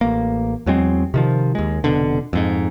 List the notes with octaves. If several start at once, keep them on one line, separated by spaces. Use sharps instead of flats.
A1 A#3
E2 F#3 G#3 C4
C3 D#3 F3
D#2 G#3
F1 A#1 B2 D3
F2 G#2